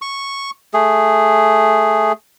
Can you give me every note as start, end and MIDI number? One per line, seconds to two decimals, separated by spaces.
0.02 0.50 85
0.74 2.12 57
0.74 2.12 68